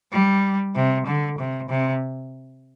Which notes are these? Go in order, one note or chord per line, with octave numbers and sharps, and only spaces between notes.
G3
C3
D3
C3
C3